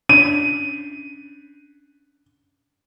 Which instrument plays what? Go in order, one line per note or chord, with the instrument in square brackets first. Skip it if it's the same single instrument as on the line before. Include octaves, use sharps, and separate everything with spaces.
[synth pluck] C#4 D4 [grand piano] D#7